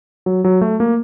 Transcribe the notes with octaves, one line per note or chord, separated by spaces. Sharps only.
F#3
F#3
A3
A#3